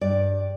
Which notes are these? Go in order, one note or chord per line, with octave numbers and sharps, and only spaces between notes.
G2 D5